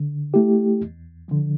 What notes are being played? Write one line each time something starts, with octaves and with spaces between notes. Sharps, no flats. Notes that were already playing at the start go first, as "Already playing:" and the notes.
Already playing: D3
A3 E4 G4
E2
D3 F3